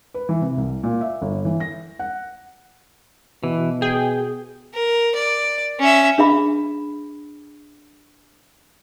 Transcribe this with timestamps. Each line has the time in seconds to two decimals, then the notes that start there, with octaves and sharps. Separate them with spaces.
0.14 B4
0.29 E3
0.42 C3
0.57 C2
0.83 A#2
1.01 E5
1.22 G1
1.45 E3
1.60 A#6
1.99 F#5
3.44 B2 E3
3.82 G#4 G5
4.74 A#4
5.16 D5
5.80 C#4 E5
6.18 D4 G#4 E5 B5